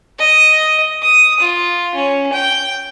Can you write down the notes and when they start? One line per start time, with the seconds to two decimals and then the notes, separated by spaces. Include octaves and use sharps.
0.19 D#5
1.02 D#6
1.40 F4
1.95 C#4
2.33 G5